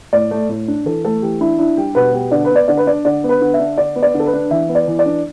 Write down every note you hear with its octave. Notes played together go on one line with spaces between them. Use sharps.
A2 D5
A3
A2
D4
E3 A4
A3 A4
E3 G4
D4 E4
D4 E4
G3 G4
B2 B4
B3 G4
D3 D5
B4
B3 D5
D3 D5
B4
D4 D5
D3 D5
B3
B4
D3
E5
D4
D3 D5
B3
D5
D3
A4
B4
D4
E3 E5
B3
D5
E3
D5
D4